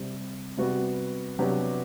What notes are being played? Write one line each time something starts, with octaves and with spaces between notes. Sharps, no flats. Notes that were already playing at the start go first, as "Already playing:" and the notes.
Already playing: C3 G3 C4 G4
C3 G3 B3 F#4
C3 F#3 B3 D4 G4